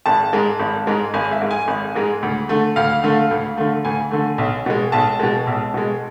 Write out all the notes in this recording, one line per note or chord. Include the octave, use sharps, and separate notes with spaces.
G#1 A5
G#2 G#3
G#1
G#2 G#3
G#1 G#5
E5
G#2 G#3
G#5
G#1
G#2 G#3
D2
D3 A3
D2 F5
D3 A3
D2
D3 A3
D2 G#5
D3 A3
B1
B2 G#3
B1 A5
B2 G#3
B1
B2 G#3